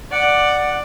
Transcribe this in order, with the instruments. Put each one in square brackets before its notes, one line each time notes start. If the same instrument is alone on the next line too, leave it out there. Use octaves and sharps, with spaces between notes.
[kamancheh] D5 [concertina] F#5